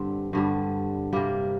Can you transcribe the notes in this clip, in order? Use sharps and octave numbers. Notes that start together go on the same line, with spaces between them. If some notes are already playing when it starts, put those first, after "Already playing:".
Already playing: G2 D3 G3 C4
G2 D3 G3
C3 G3 A#3